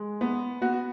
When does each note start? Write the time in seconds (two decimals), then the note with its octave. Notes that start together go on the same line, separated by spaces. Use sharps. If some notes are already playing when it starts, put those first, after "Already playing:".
Already playing: G#3
0.21 B3
0.61 B3 F#4